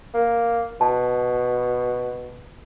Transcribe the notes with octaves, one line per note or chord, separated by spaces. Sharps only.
A#3
B2 A5